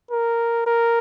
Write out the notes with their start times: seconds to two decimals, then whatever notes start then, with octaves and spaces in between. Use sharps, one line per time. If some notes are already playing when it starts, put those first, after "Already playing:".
0.11 A#4
0.66 A#4